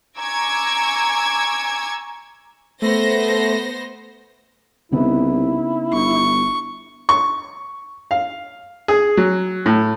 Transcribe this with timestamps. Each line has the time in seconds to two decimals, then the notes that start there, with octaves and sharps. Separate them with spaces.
0.18 G#5 A#5 C#6 D6 E6 G#6
2.82 A3 B3 C5 A#6
4.92 C2 C#3 B3 D#4 E4
5.93 G1 C#6
7.09 C#6
8.11 F5
8.88 G#4
9.17 F#3
9.66 A2